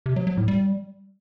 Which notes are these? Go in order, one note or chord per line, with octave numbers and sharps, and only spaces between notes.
C3
F#3
F#3
A2
G3